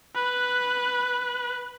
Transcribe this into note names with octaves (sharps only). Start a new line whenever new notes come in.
B4 F#6